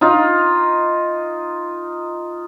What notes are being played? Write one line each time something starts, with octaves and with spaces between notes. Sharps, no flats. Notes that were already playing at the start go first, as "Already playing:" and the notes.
D#4 F4